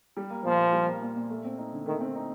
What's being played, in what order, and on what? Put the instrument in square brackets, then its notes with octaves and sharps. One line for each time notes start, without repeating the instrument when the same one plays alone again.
[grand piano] G3
A#3
[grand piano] A#2 [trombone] F3
[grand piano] A#2
G3
A#3
A#2
A#2
A3
C4
D#4
D3
[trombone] D#3 [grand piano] A3
[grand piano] C4
D#4